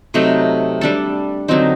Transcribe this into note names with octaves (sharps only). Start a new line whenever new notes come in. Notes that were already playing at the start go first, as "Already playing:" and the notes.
C3 F#3 A3 D#4
G3 D4 A4
D3 F#3 C4 D#4